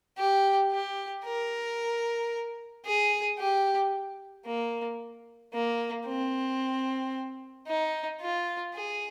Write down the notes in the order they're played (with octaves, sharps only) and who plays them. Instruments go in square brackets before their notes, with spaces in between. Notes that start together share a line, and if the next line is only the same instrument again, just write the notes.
[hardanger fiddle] G4
G4
A#4
G#4
G4
A#3
A#3
C4
D#4
F4
G#4